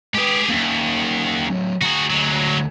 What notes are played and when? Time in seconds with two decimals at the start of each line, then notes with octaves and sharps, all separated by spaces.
0.14 G#3 G4 G#4 B4
0.49 D#2 A#3 C#4
1.49 A2 F#3
1.82 D2 F#4 G#4 A#5
2.10 F#3 G#3